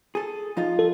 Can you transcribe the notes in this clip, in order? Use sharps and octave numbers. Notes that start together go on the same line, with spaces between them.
G#4 A4
F3 D#4 F4
A4